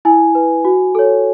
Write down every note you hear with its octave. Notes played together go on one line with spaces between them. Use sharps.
E4 G#5
B4
F#4
A4 C#5